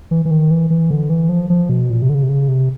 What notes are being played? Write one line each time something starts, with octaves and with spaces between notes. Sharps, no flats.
E3
E3
D#3
E3
E3
D3
E3
F3
F3
B2
A#2
C3
D3
C#3
C3
C#3
C3